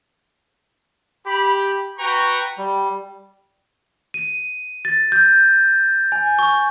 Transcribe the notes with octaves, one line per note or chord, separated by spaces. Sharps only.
G4 B5
F#4 B4 G5 A#5 C#6
G3
D#7
A6
G6
G#5
C#6